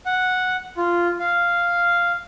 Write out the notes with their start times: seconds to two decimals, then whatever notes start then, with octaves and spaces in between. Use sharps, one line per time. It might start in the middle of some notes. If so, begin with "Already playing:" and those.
0.06 F#5
0.77 F4
1.20 F5